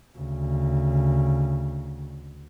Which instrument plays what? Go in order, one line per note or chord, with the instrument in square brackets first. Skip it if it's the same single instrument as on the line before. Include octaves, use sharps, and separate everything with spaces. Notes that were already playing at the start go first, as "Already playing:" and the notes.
[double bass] D2 C#3